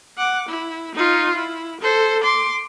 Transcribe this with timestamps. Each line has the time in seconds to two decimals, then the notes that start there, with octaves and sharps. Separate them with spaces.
0.18 F#5 D6
0.49 E4
0.95 D#4 F4
1.36 E4
1.81 A4 C5
2.23 C6 D6